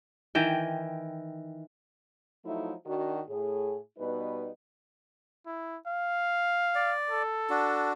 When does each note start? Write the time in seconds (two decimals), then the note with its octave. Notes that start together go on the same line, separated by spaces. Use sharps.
0.35 D#3 E3 G5
2.45 F3 F#3 A3 D#4 E4
2.86 D#3 D4 F#4
3.28 A2 G#4
3.98 B2 G3 D#4 B4
5.47 E4
5.88 F5
6.75 D5
7.10 A4
7.50 D4 F#4